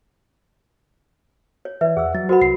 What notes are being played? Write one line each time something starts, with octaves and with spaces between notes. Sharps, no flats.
C#5
E3 B4 D5 E5
E2 G#4 F#5 E6
F#3 A6
F#4 A#4 C5 F#5 B5
C2 C7